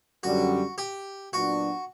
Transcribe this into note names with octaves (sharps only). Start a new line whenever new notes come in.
F#2 D3 G3 F#4
G4
A#2 F#3 B3 D4 F#4